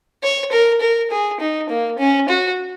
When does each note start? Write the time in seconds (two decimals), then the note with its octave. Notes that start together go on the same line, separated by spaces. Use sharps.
0.23 C#5
0.51 A#4
0.81 A#4
1.11 G#4
1.40 D#4
1.69 A#3
1.99 C#4
2.29 F#4